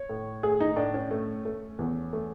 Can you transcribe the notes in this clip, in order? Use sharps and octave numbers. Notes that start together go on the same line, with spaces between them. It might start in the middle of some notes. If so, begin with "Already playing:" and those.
Already playing: C#5
A2
A3 G#4
D#4
A2 D4
C#4
A3
A3
E2
A3